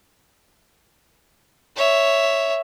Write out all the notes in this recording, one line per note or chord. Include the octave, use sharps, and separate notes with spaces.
C#5 E5